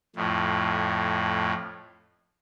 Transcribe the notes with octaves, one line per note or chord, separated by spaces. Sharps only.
F2 A2